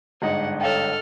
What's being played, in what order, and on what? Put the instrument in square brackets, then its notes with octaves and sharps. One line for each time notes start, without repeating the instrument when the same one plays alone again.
[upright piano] G1 G#2 D#5 [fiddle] F#5
[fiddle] A4 F6 [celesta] C#5 F5 G5